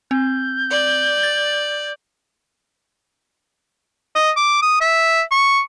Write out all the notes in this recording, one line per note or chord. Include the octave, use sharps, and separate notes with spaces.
C4 G6
D5
A6
D#5
D6
D#6
E5
C#6